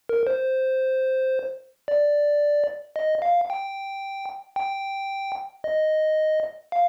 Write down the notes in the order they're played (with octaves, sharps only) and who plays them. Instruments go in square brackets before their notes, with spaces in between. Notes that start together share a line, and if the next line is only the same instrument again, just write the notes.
[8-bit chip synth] A#4
C5
D5
D#5
F5
G5
G5
D#5
F5